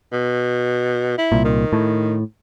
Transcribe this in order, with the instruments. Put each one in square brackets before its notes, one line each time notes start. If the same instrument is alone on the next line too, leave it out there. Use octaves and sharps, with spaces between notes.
[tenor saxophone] B2
E4
[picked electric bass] C2 A#2
[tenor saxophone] D#3
[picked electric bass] A2